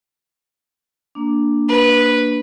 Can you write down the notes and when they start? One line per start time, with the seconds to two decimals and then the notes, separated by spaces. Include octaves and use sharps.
1.15 A#3 D4
1.68 B4